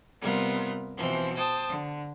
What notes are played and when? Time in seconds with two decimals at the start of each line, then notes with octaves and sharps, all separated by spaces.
0.21 C3 G3 B3 F4 A#4
0.97 B2 E3 F3 C4
1.36 C5 G5 A5 D#6
1.68 D3